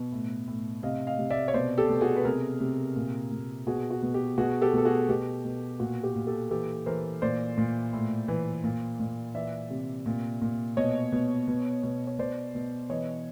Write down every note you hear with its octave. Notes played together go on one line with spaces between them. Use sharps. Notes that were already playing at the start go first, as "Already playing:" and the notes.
Already playing: B2
A2
A2
C3 D#5 F5
D#5 F5
C3
D5 E5
C#5
B2 C5 D5
G4 A4
B2
F#4 G#4
B4
C3 G#4 A#4
C3
A#2
A#2
B2 F#4 G#4
F#4
B2
G4
B2 F#4 G#4
G4 A4
B2 A4
F#4 G#4
B2 G4
B2
A#2 F#4
G4
A#2
G4 A4
E3 G4 A4
E3 A#4 C5
A#2 C5 D5
A#2
A2
E3
A#2
A#2
E3 D5 E5
C3
A#2
A#2
B2 C#5 D#5
B2
B2
B2
C#5
B2 C5 D5
B2
E3 C#5 D#5